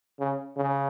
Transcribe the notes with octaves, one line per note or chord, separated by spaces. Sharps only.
C#3
C#3